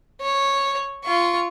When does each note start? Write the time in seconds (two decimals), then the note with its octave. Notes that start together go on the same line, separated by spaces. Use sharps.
0.22 C#5
1.04 F4 C#6